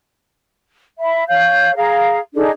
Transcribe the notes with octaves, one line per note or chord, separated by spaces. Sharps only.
E5 B5
C#5 F5 G6
G#4 F5 A#5
D4 D#4 G#4 A4